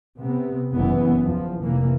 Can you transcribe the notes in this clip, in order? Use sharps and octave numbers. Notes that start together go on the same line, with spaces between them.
C3 B3
F#1 E3 B3
E2 F3
F1 E3 A#3